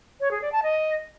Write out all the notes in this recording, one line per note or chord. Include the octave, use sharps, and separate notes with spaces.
C#5
G#4
D5
A5
D#5